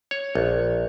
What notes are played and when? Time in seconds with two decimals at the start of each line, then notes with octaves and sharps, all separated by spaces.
0.11 C#5
0.35 A#1